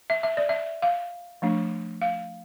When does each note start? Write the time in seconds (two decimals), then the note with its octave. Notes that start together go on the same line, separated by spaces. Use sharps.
0.10 E5
0.23 E5
0.37 D5
0.49 E5
0.82 F5
1.42 F3 A3 D4
2.02 F5